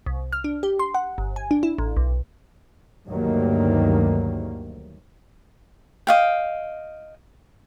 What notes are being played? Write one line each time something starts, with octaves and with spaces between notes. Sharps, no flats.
C2
F6
D4
G4
C6
F#5
G1
G#5
D4
E4
A1
B1
D2 G2 D#3 F#3 G3 A#3
D#5 F5 G5